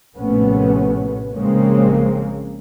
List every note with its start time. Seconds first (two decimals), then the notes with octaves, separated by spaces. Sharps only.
0.17 A#1 A2 C3 A3 B3 C#4
1.35 A#1 C#3 G#3 A#3 C4 C#4